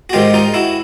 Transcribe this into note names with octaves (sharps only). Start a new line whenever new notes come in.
F#4
G#2 D#3 G#3 F4 G4
D#4 F4
E4 F#4